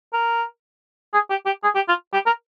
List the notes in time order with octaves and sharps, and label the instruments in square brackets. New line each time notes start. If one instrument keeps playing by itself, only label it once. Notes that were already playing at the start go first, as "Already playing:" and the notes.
[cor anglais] A#4
G#4
G4
G4
G#4
G4
F4
G4
A#4